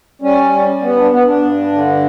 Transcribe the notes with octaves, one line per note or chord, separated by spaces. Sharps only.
G3 C#4
G3
B3
D4
B3
D4
G2
D3